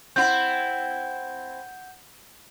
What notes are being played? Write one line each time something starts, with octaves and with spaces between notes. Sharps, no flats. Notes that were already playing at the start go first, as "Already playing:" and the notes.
C4 E4 F#5 G6